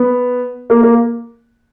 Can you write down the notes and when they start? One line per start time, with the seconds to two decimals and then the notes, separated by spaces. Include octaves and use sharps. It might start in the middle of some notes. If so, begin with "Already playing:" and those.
Already playing: B3
0.70 A#3
0.83 A#3